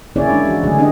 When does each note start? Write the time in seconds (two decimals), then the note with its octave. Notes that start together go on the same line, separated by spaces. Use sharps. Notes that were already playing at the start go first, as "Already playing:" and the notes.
0.16 A#3 C#4 E4 G#4 C#5 D5
0.29 E3 G#3 D4 E4
0.45 E3 F#3 F#4
0.63 D3 G3 A3 F#4 G#4
0.78 B3 C#4 D4 G4 D#5